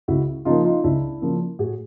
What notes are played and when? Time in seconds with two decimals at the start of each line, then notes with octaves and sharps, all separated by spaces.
0.08 C#2 E4 F#4
0.45 C#3 F3 A#3 D#4 F4
0.64 D#4 F4
0.83 C#2 D4 E4
1.22 C#3 F3 A#3
1.59 A2 F#4 G#4